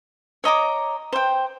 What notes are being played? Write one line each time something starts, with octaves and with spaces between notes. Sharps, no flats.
C#5 D#5 A#5 D6
C5 G5